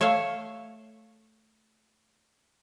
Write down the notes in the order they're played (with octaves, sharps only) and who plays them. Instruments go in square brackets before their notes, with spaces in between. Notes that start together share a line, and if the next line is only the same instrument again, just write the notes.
[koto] A3 C#5 E5 F5